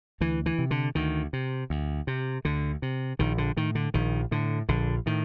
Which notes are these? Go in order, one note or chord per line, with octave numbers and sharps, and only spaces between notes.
D2 E3
E3
C3
D3
D2 D#3
C3
D2
C3
D2 D3
C3
A#1 D#3
D3
A2 D#3
D3
A#1 D#3
A2 D3
A#1 D3
A2 D#3